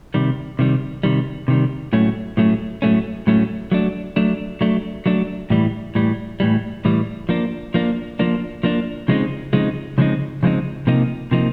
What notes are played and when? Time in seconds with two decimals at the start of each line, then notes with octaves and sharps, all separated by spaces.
0.14 C3 D#3 G3
0.59 C3 D#3 G3
1.03 C3 D#3 G3
1.48 C3 D#3 G3
1.93 A2 F#3 A3 C#4
2.37 A2 F#3 A3 C#4
2.82 A2 F#3 A3 C#4
3.27 A2 F#3 A3 C#4
3.72 F#3 A3 D4
4.16 F#3 A3 D4
4.61 F#3 A3 D4
5.06 F#3 A3 D4
5.50 A2 E3 G3
5.95 A2 E3 G3
6.40 A2 E3 G3
6.85 A2 E3 G3
7.29 F3 A#3 D4
7.74 F3 A#3 D4
8.19 F3 A#3 D4
8.63 F3 A#3 D4
9.08 C#3 F3 G#3 C4 D#4
9.53 C#3 F3 G#3 C4 D#4
9.98 C#3 F3 G#3 C4 D#4
10.43 C#3 F3 G#3 C4 D#4
10.87 C3 F3 A#3 D#4
11.31 C3 F3 A#3 D#4